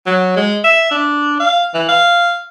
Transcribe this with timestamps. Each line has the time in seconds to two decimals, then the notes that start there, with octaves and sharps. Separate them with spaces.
0.06 F#3
0.37 G#3
0.64 E5
0.91 D4
1.40 F5
1.74 E3
1.89 F5